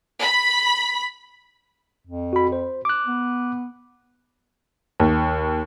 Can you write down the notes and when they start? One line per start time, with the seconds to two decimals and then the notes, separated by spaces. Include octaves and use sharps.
0.22 B5
2.07 F2
2.33 F#4 B5
2.52 C5
2.85 D6 F#6
3.06 B3
5.00 D#2